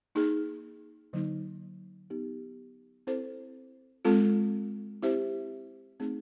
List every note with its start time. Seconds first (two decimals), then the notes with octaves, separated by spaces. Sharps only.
0.15 A#3 D#4 G#4
1.13 D3 F#3 A#3 D#4
2.10 B3 D#4 G4
3.07 C4 E4 A4 C5
4.05 G#3 C4 F4 A4
5.02 C4 E4 G4 C5 E5
6.00 A3 C4 D#4 G#4